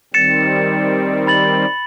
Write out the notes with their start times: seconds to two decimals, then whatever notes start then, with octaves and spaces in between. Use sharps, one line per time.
0.14 D#3 G3 C4 A6 C#7 E7
1.27 B5 A6 F#7